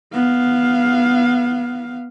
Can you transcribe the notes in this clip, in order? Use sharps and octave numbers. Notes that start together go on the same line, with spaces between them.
B3 F5